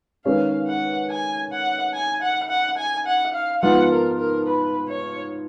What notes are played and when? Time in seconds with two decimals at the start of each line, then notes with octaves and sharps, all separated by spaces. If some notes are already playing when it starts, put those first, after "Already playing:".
0.25 D#3 G#3 C#4 G#4 B4 F5
0.67 F#5
1.10 G#5
1.52 F#5
1.94 G#5
2.22 F#5
2.50 F#5
2.78 G#5
3.06 F#5
3.34 F5
3.62 G#2 F3 B3 F4 F#5
3.91 A#4
4.19 A#4
4.46 B4
4.89 C#5